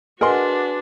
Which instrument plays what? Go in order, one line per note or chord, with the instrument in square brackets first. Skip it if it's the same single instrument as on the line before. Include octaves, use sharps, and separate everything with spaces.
[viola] D4 F#4 [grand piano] G#4 F#5 C6 [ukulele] A#4 D#5 [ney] B4